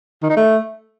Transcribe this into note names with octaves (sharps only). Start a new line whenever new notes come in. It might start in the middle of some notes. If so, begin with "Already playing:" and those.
D#3
D#4
A3